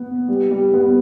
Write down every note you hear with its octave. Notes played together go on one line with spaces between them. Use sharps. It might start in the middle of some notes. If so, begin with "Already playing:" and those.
Already playing: B3
G3
G3
B3